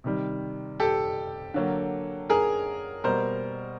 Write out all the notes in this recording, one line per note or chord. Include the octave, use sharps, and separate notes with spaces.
C3 D#3 G3
G4 A4
D3 F#3 A#3
G#4 A#4
B2 G3 A#3 A#4 C5